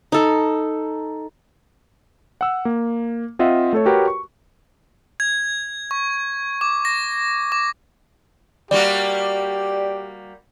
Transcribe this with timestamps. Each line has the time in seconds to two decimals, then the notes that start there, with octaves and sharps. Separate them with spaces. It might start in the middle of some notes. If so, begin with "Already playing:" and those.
0.12 D#4 A4
2.41 F#5 E6
2.65 A#3
3.39 C4 F4 D#5 E5 F#5
3.73 A3 A4 C#5
3.86 F#4 G4 A#4 B4 C#5
4.08 C#6
5.20 G#6
5.91 C#6
6.61 D6
6.85 A#6
7.52 D6
8.71 G3 A#3 F#4 G4 D5